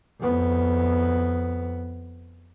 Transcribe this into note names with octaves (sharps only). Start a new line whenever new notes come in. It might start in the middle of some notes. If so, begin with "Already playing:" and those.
F2 B3